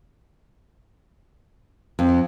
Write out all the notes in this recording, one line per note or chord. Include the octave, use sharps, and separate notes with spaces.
F2